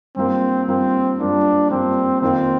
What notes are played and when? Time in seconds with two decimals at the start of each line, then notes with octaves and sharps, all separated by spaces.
0.16 G2 F3 A#3 C4
0.68 G2 F3 A#3 C4
1.19 G2 F3 A#3 D4
1.70 G2 F3 A#3 C4
2.21 F2 D#3 A#3 C4 F4